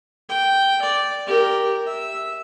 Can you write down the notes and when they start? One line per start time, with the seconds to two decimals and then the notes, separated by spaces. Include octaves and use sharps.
0.29 G5
0.82 D5
1.27 G4 A#4
1.87 E5